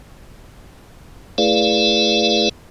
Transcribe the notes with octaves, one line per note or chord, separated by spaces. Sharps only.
A3 E4 G#4 B4 D5 F5